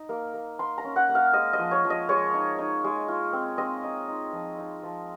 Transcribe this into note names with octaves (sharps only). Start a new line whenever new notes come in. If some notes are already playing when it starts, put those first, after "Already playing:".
Already playing: D#4
A#3
A#3
A#3 C6
A#5
C#4
F#5
A#3
F5
G#3 D#5
D#5
F3
C#5
F3
D#5
G#3 C#5
D#4
D#4
G#3
F4
C4
C4 D#5
D#4
D#4
F3
D#4
F3